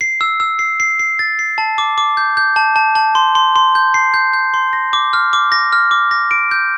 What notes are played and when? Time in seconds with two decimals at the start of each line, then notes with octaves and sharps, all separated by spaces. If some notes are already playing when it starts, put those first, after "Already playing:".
0.01 C7
0.21 E6
0.40 E6
0.59 C7
0.80 C7
0.99 C7
1.19 A6
1.39 C7
1.58 A5
1.78 D6
1.98 D6
2.17 G6
2.37 G6
2.56 A5
2.76 A5
2.95 A5
3.15 C6
3.35 C6
3.56 C6
3.75 G6
3.94 C7
4.14 G6
4.33 G6
4.54 C6
4.73 A#6
4.93 D6
5.13 F6
5.33 D6
5.52 A#6
5.73 F6
5.91 D6
6.11 A#6
6.31 D7
6.51 G6